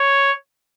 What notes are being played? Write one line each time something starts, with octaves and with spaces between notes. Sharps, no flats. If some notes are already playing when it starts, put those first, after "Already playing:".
Already playing: C#5